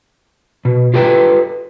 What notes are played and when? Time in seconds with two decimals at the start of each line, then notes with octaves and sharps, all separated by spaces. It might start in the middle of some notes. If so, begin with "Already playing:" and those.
0.65 B2
0.94 F4 G4 A4 B4 G5